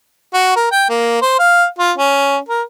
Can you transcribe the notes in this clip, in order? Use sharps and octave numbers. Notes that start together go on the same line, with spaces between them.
F#4
A#4
G5
A#3
C5
F5
F4
C#4
A#4